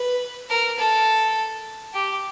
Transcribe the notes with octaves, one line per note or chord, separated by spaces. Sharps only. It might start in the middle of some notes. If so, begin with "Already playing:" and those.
Already playing: B4
A#4
A4
G4